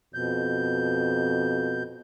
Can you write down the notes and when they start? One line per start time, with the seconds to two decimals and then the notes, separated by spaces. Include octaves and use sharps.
0.14 F2 B2 G6